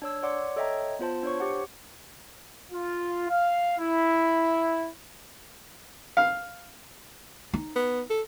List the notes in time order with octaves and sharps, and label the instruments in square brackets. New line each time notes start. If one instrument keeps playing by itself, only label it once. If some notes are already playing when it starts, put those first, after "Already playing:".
[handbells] D4 C#5 E6
C#5 D5 F#5 C6 D6
A4 C#5 D#5 E5 G5 A#5
B3 F4 C5 A5
D4 C5 C#5 C#6
G4 F#5
[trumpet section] F4
F5
E4
[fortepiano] F5
[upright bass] D#4
[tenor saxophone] B3
A4